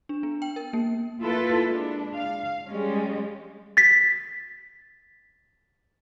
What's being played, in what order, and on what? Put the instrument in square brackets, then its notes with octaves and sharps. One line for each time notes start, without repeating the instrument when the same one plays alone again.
[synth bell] D4
B3
G5
A#4
A#3
[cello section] A#3 E4 F4 A4 B4
G#3 D4
F5
G3 G#3 C#4
[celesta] A6 B6